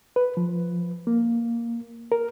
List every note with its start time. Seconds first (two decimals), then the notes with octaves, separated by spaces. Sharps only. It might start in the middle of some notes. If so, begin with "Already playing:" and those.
0.16 B4
0.37 F3
1.07 A#3
2.12 A#4